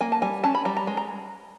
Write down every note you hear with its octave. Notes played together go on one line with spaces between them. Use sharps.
A#3 G#5
A5
G3 G#5
C#4 A5
B5
G3 A#5
A#5
G#3
A#5